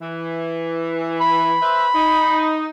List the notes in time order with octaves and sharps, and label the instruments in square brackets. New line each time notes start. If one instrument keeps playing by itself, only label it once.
[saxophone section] E3
[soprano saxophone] B5
[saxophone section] B4 C5 E5
D#4